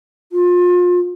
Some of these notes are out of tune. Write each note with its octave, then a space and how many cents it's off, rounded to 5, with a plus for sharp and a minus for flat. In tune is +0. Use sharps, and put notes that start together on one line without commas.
F4 +30